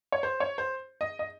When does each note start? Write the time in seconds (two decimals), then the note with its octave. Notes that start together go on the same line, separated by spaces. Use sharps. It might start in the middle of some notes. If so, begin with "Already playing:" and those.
0.12 C#5
0.23 C5
0.40 C#5
0.58 C5
1.01 D#5
1.19 D#5